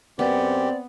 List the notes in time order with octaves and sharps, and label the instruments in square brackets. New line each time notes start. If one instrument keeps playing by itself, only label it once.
[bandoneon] F#2 G4 [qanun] B3 [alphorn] C4 [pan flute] D5